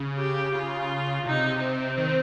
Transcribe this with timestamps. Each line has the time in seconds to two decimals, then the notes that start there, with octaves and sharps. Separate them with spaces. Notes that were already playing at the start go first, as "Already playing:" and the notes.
Already playing: C#3
0.19 G4
0.55 C#3 F4
1.26 C3 D#4
1.61 C4
1.97 D#3